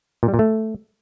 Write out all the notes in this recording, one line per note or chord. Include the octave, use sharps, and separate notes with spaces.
A#2
G3
A#2
A3